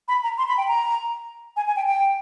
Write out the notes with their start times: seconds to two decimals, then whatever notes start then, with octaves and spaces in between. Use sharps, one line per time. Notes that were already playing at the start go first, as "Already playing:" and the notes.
0.08 B5
0.23 A#5
0.38 C6
0.48 B5
0.58 G5
0.68 A#5
1.56 G#5
1.67 G#5
1.76 G5
1.87 G5